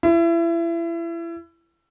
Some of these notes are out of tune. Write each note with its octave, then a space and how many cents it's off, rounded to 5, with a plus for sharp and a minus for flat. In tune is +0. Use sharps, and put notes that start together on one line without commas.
E4 +30